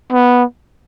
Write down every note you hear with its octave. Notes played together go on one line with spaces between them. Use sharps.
B3